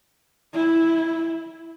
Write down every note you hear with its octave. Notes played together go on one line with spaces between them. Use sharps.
E4